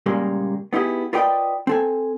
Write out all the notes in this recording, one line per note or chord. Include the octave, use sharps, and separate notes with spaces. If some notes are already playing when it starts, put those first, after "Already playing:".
A#2 C#3 G3 G#3 A#3
B3 D#4 E4 G4 G#4
F4 A#4 B4 D5 D#5 G5
C4 A4 G#5